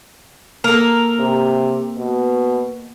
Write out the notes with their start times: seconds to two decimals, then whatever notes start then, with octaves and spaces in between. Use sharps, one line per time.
0.64 A#3 A4 A#4
1.19 C3
1.98 B2